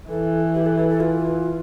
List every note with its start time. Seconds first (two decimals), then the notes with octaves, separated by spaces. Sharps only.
0.09 E3 A4
0.55 G4
0.66 A4
0.77 A4
0.89 A4
1.00 F4